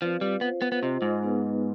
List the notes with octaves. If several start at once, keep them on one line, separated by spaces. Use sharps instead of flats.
F3 C4 F4 B4 D5 F5
G3
B3 F4 C5 F5
B3
B3
C3 F4 C5 D#5
G#2
B3 D#4 G#4 B4